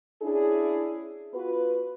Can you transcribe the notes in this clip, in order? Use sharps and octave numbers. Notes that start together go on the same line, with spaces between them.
C#4 D4 E4 G#4
B3 F4 F#4 B4